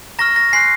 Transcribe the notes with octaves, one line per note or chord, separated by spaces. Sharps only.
A#5 C#6 F6 A#6
A#6
G#5 C6 F#6 C7